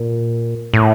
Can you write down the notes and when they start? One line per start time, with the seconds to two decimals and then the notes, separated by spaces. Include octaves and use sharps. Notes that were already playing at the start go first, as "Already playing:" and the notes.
Already playing: A#2
0.74 A2